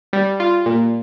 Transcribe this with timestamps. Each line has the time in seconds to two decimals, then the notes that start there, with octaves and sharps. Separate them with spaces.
0.13 G3
0.40 F4
0.66 A#2